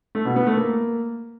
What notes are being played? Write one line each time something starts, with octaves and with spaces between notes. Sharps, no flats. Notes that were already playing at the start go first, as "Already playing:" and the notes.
A3
B2
B3
A3
A#3